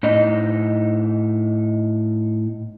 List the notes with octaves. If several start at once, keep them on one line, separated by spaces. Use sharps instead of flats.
A2 D#4 D#5